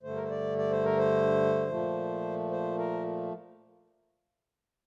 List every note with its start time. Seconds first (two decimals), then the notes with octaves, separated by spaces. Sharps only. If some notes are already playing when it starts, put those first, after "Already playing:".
0.03 G2 D3 A3 C5
0.16 A#4
0.23 C5
0.30 D5
0.58 D5
0.71 C5
0.85 A#4
0.97 C5
1.68 A#2 F3 A3
2.51 C5
2.78 A#4